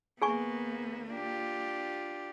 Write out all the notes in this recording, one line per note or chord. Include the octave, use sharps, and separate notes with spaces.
D#2 A#3 B3 G#4 G#5 C#6
D4 F4 G4